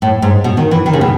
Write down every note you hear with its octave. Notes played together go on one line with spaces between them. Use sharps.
A2
G#2
B2
D#3
E3
D#3
C#3
B2